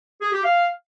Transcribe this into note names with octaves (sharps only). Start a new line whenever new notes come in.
G#4
G4
F5